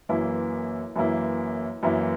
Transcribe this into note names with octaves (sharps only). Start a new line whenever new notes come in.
F#2 E3 A#3 E4
F#2 E3 A#3 E4
F#2 E3 A#3 E4